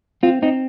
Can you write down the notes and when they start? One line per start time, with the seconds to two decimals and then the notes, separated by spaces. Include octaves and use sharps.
0.23 C4 F4
0.42 C4 D#4